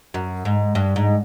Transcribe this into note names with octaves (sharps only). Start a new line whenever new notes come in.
F#2
G#2
G2
G#2